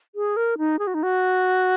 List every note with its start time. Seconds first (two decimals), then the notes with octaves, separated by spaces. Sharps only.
0.15 G#4
0.37 A#4
0.58 D#4
0.79 G#4
0.87 F#4
0.94 D#4
1.03 F#4